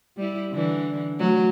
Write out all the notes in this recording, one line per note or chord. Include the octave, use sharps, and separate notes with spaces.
G3 E4
D3 E3
F#3 A3